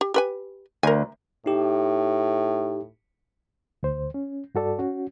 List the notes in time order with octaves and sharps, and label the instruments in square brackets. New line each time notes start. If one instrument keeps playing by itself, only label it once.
[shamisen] G4
G4 B4 G#5
[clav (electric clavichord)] D2 [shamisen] A#4 G#5
[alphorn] A2 [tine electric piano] D#4 G4
[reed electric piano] D2 C5
C#4
G2 F#4 A4 D5
C#4 F#4